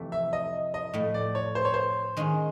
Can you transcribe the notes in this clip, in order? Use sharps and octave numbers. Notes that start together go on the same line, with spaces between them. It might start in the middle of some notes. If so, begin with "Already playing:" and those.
Already playing: F2 C3 E3 A3
E5
D#5
D#5
A2 F3 A3
D5
C#5
C5
C#5
C5
D#3 G#3 C#4 F4